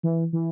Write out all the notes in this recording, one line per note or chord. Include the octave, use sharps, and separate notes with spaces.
E3
E3